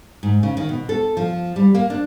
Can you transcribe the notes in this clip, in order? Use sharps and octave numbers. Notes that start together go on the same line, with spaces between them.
G#2
C#3
D#3
B2
A4
F3
G3
A#3
D4